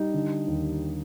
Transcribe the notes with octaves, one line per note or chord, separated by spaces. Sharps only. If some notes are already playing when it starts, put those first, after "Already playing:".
Already playing: G3 D#4
D3
D#2